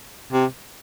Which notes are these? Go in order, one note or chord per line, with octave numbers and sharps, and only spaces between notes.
C3